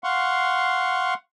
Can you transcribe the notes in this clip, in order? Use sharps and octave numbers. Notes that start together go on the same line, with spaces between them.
F5 F#5 C6 C#6